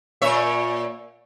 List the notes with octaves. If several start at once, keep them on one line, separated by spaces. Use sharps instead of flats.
A#2 C#5 E5